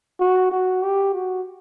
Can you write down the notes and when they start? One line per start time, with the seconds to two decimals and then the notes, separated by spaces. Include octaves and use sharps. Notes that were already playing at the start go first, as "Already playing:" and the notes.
0.20 F#4
0.52 F#4
0.83 G4
1.14 F#4